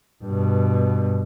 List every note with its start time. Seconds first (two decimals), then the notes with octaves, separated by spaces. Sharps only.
0.24 G2 B2